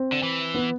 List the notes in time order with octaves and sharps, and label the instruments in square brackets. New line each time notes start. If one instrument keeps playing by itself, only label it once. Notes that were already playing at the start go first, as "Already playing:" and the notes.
Already playing: [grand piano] C4
[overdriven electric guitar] D3
E3
[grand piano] B3